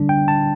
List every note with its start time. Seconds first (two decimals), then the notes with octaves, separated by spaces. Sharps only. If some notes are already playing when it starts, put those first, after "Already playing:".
Already playing: D3 G3 D4
0.09 G5
0.28 A5